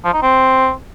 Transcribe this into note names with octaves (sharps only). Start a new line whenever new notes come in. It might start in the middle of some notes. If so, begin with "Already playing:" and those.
F3
D#4
C4